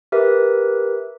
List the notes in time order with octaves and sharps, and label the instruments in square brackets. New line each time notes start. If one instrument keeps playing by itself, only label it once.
[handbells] G4 A#4 B4 E5